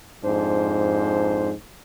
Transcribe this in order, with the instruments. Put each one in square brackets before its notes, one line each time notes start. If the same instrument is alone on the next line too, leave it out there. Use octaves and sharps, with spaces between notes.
[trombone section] F2 G#2 D4 C5